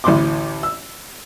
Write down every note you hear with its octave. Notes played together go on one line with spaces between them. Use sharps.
A1 D2 A2 E4 C6 D6
E6